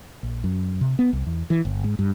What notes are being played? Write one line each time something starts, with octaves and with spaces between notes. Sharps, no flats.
A#1
F#2
C3
B3
C2
E2
E3
G1
G#2
G2